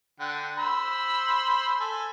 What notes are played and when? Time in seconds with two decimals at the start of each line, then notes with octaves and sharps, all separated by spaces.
0.20 D3 F#5 G5
0.58 C5 B5 E6
1.80 A4 G#5